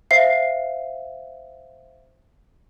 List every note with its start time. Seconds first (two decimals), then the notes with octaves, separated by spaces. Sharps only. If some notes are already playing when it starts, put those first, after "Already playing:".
0.11 C5 E5 F5 C7